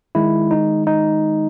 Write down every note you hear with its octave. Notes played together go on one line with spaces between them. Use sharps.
D#3 G#3 E4
D#4
D#4